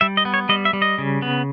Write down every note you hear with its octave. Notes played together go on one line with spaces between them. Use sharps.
G3 E5
D#5
B3
C#5
G3 D#5
E5
G3
D#5
C#3
B3